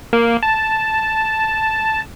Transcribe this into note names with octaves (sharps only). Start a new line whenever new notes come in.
A#3
A5